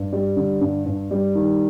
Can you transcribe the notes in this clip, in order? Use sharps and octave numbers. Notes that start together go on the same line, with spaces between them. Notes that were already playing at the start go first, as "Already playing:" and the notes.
Already playing: G2
G3
D3
G2
G2
G3
D#3